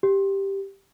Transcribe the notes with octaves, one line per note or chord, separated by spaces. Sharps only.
G4